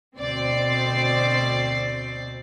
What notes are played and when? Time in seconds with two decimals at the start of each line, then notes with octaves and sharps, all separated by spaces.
0.17 D2 B2 C4 C5 D5 C7